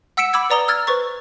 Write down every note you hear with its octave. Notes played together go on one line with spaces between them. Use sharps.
F#5 E6 B6 C#7 D7 E7
B5 D6 E6 G#6
B4 D5 A#5 D#6 G7
E6 F6 G#6 A6
B4 C5 C#6 A6